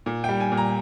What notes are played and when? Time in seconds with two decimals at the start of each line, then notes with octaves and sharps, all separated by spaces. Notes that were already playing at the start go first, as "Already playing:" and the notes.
0.06 A#2
0.24 G3 G5
0.40 G#5
0.52 A#2
0.57 A#5